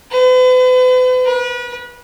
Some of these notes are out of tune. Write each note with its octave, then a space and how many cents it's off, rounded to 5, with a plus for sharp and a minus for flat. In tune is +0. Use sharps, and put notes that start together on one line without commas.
B4 +45
B4 -35